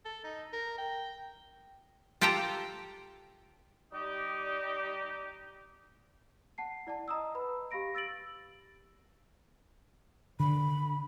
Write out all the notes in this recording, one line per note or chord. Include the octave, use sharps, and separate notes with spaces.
A4
D#4
A#4
G5
F4 G4 A4 G5 A5 A#5
G3 D#4 G4
F#5 A5 C7
E4 D5 F#5 A5
D#5 A#5 D#6 E6
B4 B5
G4 F5 B5 A#6 D7
E6 A6 D7 F#7
D3 B5